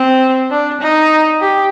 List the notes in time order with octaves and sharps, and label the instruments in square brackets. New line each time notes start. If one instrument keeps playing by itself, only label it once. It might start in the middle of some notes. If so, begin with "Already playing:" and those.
Already playing: [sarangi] C4
D4
D#4
G4